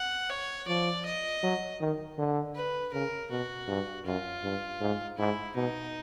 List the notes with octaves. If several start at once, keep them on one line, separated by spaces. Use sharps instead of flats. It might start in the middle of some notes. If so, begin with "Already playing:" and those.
Already playing: F#5
C#5
F3 D5
D#5
F#3
D#3
D3
B4
C#3 A#4
B2 F#4
G2
F#2 F4
G2
G#2
G#2 E4
B2 D#4